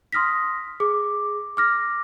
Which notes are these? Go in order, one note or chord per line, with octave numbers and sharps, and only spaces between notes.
C6 D#6 F6 A#6 B6
G#4 D6
D6 F6 A#6